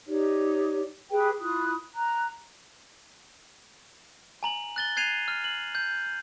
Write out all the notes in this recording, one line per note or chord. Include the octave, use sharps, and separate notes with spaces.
D#4 G4 C#5 D5
G4 G#4 B4 G5
E4 F4 D#6 F#6
A#5 F#6
G#5 A#5 F#7
F#6 A6 G7
F#6 G#6 C7 D#7 F7
F6
F#7
G6